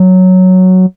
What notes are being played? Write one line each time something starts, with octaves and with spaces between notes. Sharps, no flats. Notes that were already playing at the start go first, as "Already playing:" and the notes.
Already playing: F#3